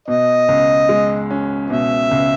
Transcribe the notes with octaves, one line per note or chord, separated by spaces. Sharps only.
B2 D#5
C#2
G#3
C#4
B2 E5
C#2